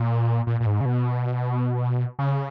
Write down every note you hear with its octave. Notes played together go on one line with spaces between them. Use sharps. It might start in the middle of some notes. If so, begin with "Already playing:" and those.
Already playing: A#2
A#2
A#2
G#2
C#3
B2
C#3